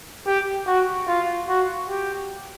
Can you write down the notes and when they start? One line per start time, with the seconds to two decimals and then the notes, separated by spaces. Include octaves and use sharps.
0.27 G4
0.67 F#4
1.08 F4
1.48 F#4
1.89 G4